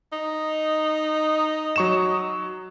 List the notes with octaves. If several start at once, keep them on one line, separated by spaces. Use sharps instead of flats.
D#4
F#3 C#6 E7